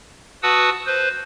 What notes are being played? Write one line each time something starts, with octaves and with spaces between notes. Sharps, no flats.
F#4 B4 F#5 A5 D#6 E6
B4 C5